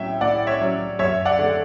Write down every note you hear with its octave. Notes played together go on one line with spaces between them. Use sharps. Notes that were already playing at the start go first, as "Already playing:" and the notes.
Already playing: A2 F#3 C#4 E5 G5
A2 D5 F#5
C#5 E5
F#3 C#4
F#2 C#5 E5
D5 F#5
D3 A3 D4